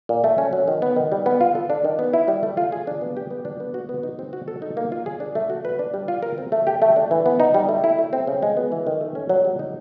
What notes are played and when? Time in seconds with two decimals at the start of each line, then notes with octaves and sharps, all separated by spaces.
0.09 A#2
0.24 A3
0.38 C#4
0.53 F#3
0.68 D#3
0.82 B3
0.96 D#3
1.12 G3
1.26 B3
1.41 F4
1.55 A4
1.70 D4
1.84 D#3
1.99 B3
2.13 E4
2.28 G3
2.43 A3
2.57 F4
2.72 G#4
2.87 D4
3.01 B3
3.17 G4
3.31 B3
3.45 D4
3.60 B3
3.74 F#4
3.89 B3
4.03 D#4
4.19 C4
4.33 F#4
4.48 A4
4.62 D#4
4.77 A#3
4.92 F4
5.06 G#4
5.20 D4
5.35 A3
5.50 F#4
5.65 B4
5.79 D4
5.94 G3
6.08 F4
6.23 A#4
6.38 C4
6.52 A3
6.67 G4
6.82 A3
6.96 D4
7.11 E3
7.26 B3
7.40 D#4
7.54 G3
7.69 A3
7.84 E4
7.98 A3
8.13 C4
8.27 C#3
8.43 G#3
8.57 B3
8.72 E3
8.87 D#3
9.01 A3
9.15 C#4
9.29 F#3
9.45 G3
9.59 D#4